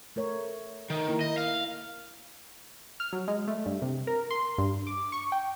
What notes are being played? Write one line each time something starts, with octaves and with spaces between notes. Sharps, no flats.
A3 A#4 C#5
D#3
A#3 E4 A#4
D#5
F5
F6
F#3
G#3
A3
G2
C3
A#4
C6
G2
D6
C#6
G5